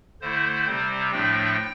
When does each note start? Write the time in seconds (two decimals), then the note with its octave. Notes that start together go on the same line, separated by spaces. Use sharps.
0.21 D3 A3 E4 C5
0.67 C3 G3 C4
1.11 A2 F3 A3 D4 G5